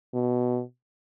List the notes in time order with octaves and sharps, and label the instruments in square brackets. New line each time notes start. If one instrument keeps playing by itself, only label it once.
[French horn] B2